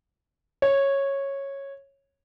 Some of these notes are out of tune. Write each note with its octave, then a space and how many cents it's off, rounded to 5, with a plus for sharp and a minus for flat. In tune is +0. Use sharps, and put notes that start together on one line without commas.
C#5 -10